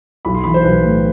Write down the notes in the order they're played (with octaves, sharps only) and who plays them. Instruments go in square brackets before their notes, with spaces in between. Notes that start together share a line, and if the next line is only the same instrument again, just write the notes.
[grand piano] B1 B5
C6
E3 B5
C5
B1 B4
A2